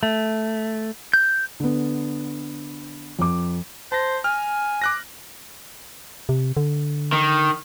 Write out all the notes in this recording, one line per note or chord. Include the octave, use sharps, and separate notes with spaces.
A3
G6
D3 B3
F2 D6
C5 A5 A#6
G#5 F6
D6 F#6 A#6
C3
D3
D#3